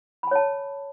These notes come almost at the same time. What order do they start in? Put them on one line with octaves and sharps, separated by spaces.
B5 G#5 C#5 A5